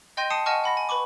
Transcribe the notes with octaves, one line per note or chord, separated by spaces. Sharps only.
D#5 G5 C6 G6 A#6 D#7
A5 D#6 C7 C#7 D#7
D#5 F#5 G#5 A5 C#6 F6
F#5 B5 A#6
G#5
B4 B5 C#6 D6